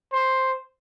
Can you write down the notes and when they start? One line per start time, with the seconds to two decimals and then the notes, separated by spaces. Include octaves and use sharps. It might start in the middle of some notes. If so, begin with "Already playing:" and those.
0.12 C5